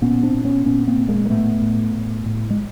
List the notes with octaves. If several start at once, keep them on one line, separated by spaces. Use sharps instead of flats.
A#2 B3 C#4
C4 D4
A#2
B3 C#4
A#2 B3 C#4
A#3 C4
A#2
G#3 A#3
A#3
A2 A3 B3
A2
A2
A2
G#3